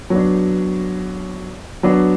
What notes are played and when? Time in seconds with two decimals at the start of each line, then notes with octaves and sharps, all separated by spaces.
0.10 F#3 B3 D4
1.83 F#3 B3 D4